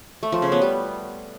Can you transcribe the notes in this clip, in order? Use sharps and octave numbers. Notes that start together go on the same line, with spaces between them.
A3
F3
C#3
B3
G3